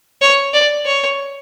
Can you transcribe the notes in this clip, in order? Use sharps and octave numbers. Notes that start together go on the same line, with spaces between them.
C#5
D5
C#5